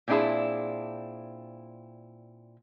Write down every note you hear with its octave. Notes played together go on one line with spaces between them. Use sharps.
A#2 C4 D4 E4 G#4 A5